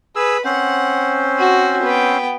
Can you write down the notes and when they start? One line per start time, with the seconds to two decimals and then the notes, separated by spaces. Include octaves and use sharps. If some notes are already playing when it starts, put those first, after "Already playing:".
0.16 G#4 B4 E6
0.45 C4 C#4 C5 F#5
1.39 F#4
1.82 B3 G5